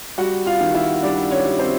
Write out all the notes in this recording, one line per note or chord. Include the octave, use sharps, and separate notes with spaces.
G3 F#4 F#5
F4 F5
D#3
E4 E5
G3 D4 D5
C#4 C#5
G3
C4 C5